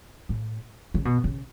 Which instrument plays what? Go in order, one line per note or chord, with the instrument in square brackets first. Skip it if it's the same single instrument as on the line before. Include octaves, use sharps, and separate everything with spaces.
[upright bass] A2
C#3
B2
C#3